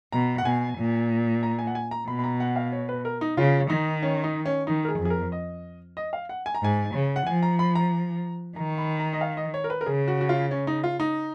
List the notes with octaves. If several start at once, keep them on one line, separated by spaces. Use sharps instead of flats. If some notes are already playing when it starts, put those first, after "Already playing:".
B2 A#5
F#5
B2 G#5
A#2
A#5
G#5
F#5
G#5
A#5
B2 B5
B5
A#5
F#5
F5
C#5
B4
A#4
D#4
C#3 F4
D#3 D#4
C#4
D#4
C#4
D#3 D#4
A#4
G#4
F2
G#4
A#4
D#5
D#5
F5
F#5
G#5
A#5
G#2 G#5
C#3
F#5
F3 G#5
A#5
B5
A#5
D#3 A#5
B5
A#5
D#5
F5
D#5
C#5
A#4
B4
A#4
C#3 G#4
F#4
F#4
F4
C#4
D#4
F4
D#4